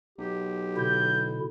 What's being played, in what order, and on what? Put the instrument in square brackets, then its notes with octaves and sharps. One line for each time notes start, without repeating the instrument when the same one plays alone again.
[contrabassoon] B1 [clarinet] G4
[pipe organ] B2 D3 E4 [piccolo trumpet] G6